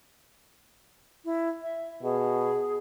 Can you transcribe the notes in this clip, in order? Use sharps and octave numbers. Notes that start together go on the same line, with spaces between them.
E4
E5
B2 G#4